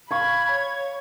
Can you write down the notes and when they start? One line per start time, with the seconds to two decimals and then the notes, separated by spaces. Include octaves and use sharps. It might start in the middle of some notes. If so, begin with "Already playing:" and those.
0.11 F5 B5 C#6 G#6
0.51 C#5